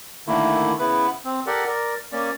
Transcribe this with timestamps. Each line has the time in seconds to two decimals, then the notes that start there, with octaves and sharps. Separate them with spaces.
0.28 D3 D#3 A3 A#3 E4
0.79 C#3 B3 E4 B4
1.25 C4
1.47 G4 A4 A#4 D5 F#5
1.66 A#4 D5
2.12 A#3 C#4 D5